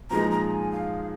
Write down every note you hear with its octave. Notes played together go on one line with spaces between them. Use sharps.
A#2 F3 G#3 D#4 A#5
A#5
G#5
F5